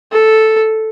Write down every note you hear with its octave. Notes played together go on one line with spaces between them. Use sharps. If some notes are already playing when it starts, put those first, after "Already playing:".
A4